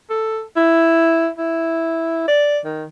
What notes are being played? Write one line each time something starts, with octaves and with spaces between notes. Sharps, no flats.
A4
E4
E4
D5
D#3